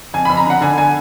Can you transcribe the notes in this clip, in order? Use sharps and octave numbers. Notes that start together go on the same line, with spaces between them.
F2 G#5
F2 B5
A#5
D3 F#5
D3 G#5
D3 G#5